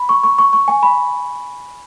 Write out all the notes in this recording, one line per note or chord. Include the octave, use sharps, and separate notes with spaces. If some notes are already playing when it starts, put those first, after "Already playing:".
Already playing: B5
C#6
C#6
C#6
C#6
G#5
B5